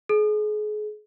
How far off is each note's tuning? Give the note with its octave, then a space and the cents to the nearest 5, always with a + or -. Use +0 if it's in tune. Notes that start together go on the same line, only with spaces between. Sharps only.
G#4 +35